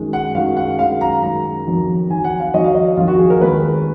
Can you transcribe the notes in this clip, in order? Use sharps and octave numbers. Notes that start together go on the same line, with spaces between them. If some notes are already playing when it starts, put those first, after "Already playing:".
Already playing: F#2 D#3 G#3
F#5
F#2 D#3 G#3 F5
F#5
F#2 D#3 G#3 F5
A#5
F#2 D#3 G#3 A#5
F2 D#3 F#3
F2 D#3 F#3 G#5
F#5
F5
F2 D#3 F#3 D#5
F5
D#5
F2 D#3 F#3 F4
F#4
G#4
A#4
D#2 D#3 G#3 B4